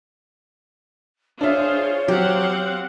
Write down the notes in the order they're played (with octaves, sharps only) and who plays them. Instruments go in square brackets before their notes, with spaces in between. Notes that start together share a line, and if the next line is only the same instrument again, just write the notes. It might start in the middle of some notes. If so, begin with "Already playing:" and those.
[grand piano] D4 E5 [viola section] F4 G#4 C5 [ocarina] C#5
[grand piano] F#3 [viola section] C4 F5 F#5 [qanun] G4